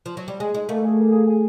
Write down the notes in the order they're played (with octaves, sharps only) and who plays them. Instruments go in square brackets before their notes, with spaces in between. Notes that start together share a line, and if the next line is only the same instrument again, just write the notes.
[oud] F3
F#3
G3
[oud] G#3 [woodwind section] G#4
[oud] G#3 [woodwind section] D#4
[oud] A3 [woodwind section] A#3
[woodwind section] G#4
A#3
G#4
G#4